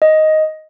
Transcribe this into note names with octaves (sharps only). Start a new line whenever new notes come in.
D#5